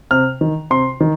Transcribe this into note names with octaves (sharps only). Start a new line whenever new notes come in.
C3 F6
D#3
C3 C6
D#3